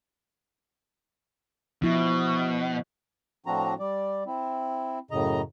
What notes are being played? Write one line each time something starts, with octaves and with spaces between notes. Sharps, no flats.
B2 F3 E4
A2 F3 C4 D4 F#4 A#5
G3 D5
C4 E4
F#2 A2 C#3 D#5 A#5